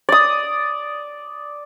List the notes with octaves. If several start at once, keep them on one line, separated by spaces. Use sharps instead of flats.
D5 D#6